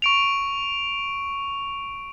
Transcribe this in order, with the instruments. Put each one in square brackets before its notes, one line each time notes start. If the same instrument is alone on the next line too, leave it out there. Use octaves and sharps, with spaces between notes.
[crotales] C#6 D7 F7